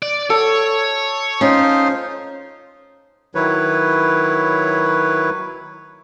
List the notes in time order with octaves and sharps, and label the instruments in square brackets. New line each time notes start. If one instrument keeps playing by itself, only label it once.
[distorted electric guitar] D5
[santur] A4 [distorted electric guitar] C#5
[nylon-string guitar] C#4 [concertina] D#4 F4 C5
[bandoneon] D#3 F#3 E4 B4 C#5